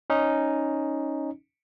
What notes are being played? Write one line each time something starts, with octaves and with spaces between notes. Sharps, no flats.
C#4 D#4